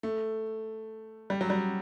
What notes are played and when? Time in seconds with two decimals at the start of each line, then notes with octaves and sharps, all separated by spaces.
0.03 A3
1.30 G3
1.41 F#3
1.50 G3